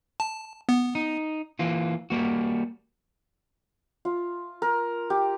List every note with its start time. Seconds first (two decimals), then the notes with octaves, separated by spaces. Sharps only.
0.20 A5
0.69 B3
0.95 D#4
1.59 E3 A#3 F4
2.10 G3 A#3 F#4
4.05 F4
4.62 A#4
5.10 G4